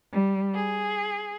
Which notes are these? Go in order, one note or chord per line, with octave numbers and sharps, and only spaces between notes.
G3
G#4